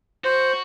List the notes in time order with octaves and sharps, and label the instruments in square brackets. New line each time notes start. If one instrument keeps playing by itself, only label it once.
[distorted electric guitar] F#4 [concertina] C5